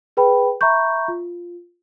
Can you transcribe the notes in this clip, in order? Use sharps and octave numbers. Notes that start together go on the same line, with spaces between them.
G#4 B4 G5 B5
E5 A#5 B5 C#6 G6
F4